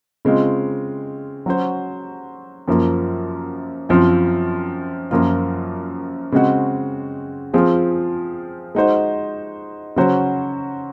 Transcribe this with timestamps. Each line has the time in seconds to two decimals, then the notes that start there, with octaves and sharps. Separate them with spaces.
0.25 C#3 G#3 C4 F4
1.46 F#3 C#4 F#4 C5
2.68 F#2 F3 A#3
3.89 F#2 F3 C4 F4
5.11 F#2 F3 A#3 F4
6.32 C#3 G#3 C4 F#4
7.54 F3 C4 F4 G#4
8.75 G#3 D#4 F#4 C5
9.96 C#3 F#3 C#4 F#4 C5